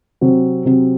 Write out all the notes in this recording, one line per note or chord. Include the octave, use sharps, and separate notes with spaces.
C3 F#3 C4
C3 F#3 C4